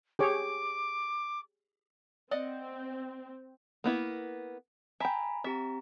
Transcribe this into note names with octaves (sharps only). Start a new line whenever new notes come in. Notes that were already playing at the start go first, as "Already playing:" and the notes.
G4 G#4 C#5 D6
C4 D5 D#5 F#5
A#3 B3 E4
E5 G5 G#5 A#5 B5
C4 G4 E5 A#5